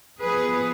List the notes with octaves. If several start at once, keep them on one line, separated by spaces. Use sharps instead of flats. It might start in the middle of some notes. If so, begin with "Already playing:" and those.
F3 B3 G#4 B4